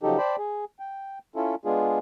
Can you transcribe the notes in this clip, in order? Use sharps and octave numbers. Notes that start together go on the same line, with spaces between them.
C#3 F3 F#3 D#4 G4 A4
C5 D5 G5 A5 B5
G#4
G5
C#4 E4 F4 A4
G#3 B3 D4 F4 G#4